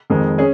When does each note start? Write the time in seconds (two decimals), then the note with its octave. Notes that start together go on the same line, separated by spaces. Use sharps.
0.10 F2 D#3 G#3
0.38 C#4 G#4